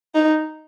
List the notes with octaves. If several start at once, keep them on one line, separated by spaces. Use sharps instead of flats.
D#4